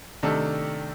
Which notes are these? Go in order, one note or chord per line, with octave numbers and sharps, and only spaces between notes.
C3 D#3 A3 D4 A4